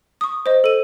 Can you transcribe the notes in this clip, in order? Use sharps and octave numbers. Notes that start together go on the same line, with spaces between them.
C#6 D#6
C5 D#5
A4 D#7